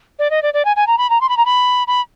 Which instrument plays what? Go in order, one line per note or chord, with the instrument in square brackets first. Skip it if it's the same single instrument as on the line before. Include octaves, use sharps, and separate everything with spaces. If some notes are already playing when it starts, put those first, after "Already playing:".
[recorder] D5
D#5
D5
D5
G#5
G#5
A#5
B5
A#5
C6
B5
A#5
B5
B5